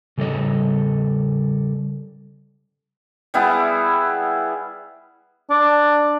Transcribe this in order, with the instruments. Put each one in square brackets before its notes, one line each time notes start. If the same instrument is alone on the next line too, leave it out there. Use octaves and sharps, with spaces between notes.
[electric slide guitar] C#3 G3 A4 C#5 D#5
[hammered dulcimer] G3 B3 E4 G#4
[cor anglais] D4